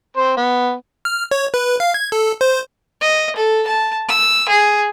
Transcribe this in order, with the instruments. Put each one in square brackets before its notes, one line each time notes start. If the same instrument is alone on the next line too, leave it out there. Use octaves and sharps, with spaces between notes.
[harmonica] C4 C5
B3
[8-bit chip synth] F6
C#5
B4
F5
G#6
A4
C5
[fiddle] D#5
A4
A5
E6
G#4